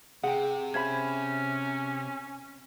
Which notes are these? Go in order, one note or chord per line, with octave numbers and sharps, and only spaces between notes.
C3 G#4 F#5 G5
C#4 C5 E5 B5 G#6